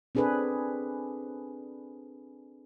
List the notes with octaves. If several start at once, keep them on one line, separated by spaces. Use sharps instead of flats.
C4 D4 G#4 A4 B4